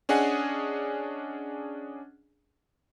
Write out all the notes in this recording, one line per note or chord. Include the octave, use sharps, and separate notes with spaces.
C#4 D4 G#4 D#5 F#5 G#5